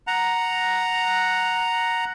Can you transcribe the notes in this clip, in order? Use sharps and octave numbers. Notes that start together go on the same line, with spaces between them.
F#5 A#5